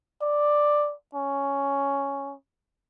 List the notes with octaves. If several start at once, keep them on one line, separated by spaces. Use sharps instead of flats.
D5
C#4